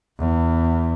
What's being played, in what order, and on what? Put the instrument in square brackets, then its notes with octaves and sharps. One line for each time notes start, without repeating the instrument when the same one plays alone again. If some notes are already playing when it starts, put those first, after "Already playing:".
[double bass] E2